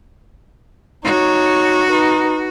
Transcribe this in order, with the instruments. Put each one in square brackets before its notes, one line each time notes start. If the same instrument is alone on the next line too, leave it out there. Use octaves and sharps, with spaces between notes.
[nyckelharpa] D#4 C#5 [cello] F#4
[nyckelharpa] D#4 B4